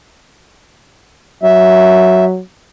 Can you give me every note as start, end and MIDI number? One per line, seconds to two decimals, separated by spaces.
1.43 2.41 54
1.43 2.25 76